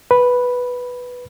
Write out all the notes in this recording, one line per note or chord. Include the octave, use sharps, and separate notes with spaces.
B4